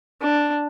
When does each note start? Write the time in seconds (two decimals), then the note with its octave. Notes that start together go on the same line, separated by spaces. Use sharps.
0.21 D4